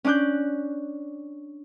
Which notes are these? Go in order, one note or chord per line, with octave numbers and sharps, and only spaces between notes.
C#4 D4 D6 F#6 G6